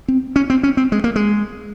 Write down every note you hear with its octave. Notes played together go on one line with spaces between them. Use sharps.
C4
C#4
C4
C#4
C4
G#3
A#3
G#3